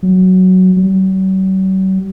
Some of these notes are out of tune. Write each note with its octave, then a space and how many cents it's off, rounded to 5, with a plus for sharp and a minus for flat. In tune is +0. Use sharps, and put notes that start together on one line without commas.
F#3 +5
F#3 +45